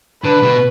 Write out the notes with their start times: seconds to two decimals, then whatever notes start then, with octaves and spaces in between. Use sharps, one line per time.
0.23 D3 B4
0.43 B2